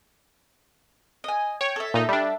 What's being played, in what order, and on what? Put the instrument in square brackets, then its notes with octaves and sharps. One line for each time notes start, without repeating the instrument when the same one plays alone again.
[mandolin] D#5 G#5
[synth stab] C#5 [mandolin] G5
[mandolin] A4 E5
[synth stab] A#2 D#4
G3 D4